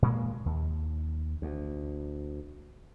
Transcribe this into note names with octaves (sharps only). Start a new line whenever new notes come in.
A#2 G#3 A#3
D#2
D2